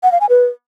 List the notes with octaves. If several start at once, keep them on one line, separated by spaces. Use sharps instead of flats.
F#5
F5
G#5
B4